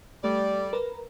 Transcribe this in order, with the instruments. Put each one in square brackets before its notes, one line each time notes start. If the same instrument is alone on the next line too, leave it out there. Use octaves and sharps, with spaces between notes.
[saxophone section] G3 D5 [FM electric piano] A3
[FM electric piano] A#4 B4 A#5